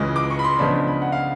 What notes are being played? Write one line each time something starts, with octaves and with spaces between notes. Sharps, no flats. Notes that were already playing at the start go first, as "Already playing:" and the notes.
Already playing: C#2 C#3 E3 G#3 D#6
D6
C#6
B5
C6
C#3 F3 G#3 B3 D4 B5
B5
F#5
F5